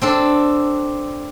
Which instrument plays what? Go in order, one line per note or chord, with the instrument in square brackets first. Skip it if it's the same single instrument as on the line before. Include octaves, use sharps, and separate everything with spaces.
[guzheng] C4 D4 A4